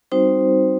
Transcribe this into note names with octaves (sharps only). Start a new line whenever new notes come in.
G3 C4 D#4 F#4 C5